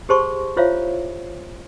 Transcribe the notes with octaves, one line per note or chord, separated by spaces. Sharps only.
G4 G#4 C5 A5 C6 C#6
E4 F4 C5 C#5 E5 F5